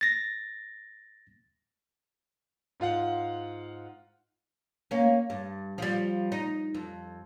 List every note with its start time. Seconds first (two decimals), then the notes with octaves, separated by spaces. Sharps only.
0.01 A6 A#6
2.80 G#2 F4 F5 F#5
4.91 A#3 C#4
5.30 G2
5.78 F3 G3
6.32 D#4
6.75 F2